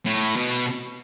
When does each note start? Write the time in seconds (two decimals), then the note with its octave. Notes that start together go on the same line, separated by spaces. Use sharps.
0.06 A2
0.36 B2